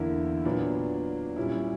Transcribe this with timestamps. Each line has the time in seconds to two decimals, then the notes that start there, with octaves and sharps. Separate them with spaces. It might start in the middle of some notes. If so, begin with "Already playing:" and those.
Already playing: E2 D3 A#3 E4
0.45 A#2 F#3 B3 D4
1.36 A#2 G3 C#4 E4